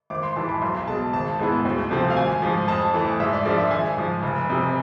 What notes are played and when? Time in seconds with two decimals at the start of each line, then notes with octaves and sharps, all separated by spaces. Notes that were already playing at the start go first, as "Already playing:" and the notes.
0.10 G#1 D6
0.23 C6
0.36 G#2 E3 A5
0.49 B5
0.62 B1 C6
0.87 B2 G#3 A5
1.13 G#1 A5
1.39 G#2 G#3 B3 E4
1.65 D2
1.91 C3 F3 A3 C4
2.10 F5
2.17 G#1 G#5
2.42 G#2 F3
2.68 F2 A5
2.94 E3 A3
3.20 G#2 E5
3.32 D5
3.45 F3 G#3 D4 F4 D5
3.58 E5
3.71 G#1 G#5
3.97 G#2 F3
4.23 F1
4.49 F2 C3